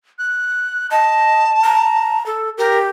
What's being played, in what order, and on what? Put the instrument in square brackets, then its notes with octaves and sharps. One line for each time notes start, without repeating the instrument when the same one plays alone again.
[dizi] F#6
[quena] D#5 [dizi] A5
[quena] A#5
A4
[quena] G4 [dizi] A#4